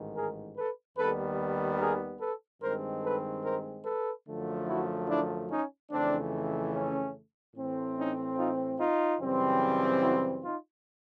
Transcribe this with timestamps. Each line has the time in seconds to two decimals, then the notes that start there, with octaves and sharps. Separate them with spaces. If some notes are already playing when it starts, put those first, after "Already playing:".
Already playing: A1 G#2 D#3
0.15 G#4 A#4
0.56 A4 B4
0.97 D#2 D#3 G3 B3 A4 B4
1.80 G#4 A#4
2.20 A4 B4
2.61 G2 D#3 G#3 C4 A#4 C5
3.03 A4 B4
3.43 A#4 C5
3.85 A4 B4
4.27 F#2 D3 F3 A3
4.68 E4 F#4
5.08 D4 E4
5.49 C#4 D#4
5.91 F2 C#3 E3 A3 C4 D4
6.73 C#4
7.55 A2 E3 A3 C4
7.96 C#4 D#4
8.37 D#4 F4
8.78 D#4 F4
9.19 F#2 C#3 E3 G3 C4
10.01 E4 F#4
10.43 D#4 F4